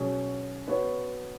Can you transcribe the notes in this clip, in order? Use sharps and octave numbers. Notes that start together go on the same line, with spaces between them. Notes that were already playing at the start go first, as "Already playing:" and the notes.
Already playing: B2 F#3 C#4 G#4
B3 F#4 C#5